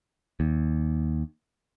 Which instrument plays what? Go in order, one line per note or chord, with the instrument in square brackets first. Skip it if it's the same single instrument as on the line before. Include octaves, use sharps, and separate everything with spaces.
[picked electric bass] D#2